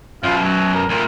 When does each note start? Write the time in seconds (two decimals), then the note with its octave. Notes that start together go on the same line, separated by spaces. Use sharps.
0.23 F#2 B2 F4
0.43 F#3
0.74 A#4
0.89 D2 A#2 A#4